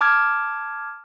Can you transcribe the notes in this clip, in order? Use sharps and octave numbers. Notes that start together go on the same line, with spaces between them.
A5 D6 F6 G#6